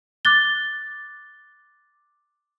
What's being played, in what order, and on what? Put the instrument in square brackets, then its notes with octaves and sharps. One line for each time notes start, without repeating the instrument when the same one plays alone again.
[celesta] D6 F#6 A6 G7